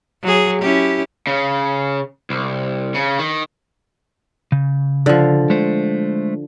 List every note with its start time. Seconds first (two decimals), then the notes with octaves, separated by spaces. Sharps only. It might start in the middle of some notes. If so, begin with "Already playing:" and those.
0.23 F#3 G#4
0.61 C#4 E4 G4
1.27 C#3
2.30 C2
2.95 C#3
3.19 D#3
4.52 C#3
5.06 D3 F3
5.50 G#3 A3 C5